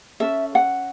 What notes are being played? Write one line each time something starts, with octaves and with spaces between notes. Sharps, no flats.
C#4 A4 E5
F#5